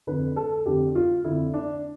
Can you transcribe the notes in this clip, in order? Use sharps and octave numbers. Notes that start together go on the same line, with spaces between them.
F2 D3 B4
A4
F2 D3 G4
F4
F2 D3 E4
D4